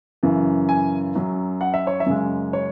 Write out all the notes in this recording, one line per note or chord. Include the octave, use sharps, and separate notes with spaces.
F#2 C#3 E3
G#5
F#2 F#3
F#5
E5
C#5
E5
F#2 C#3 G#3
C#5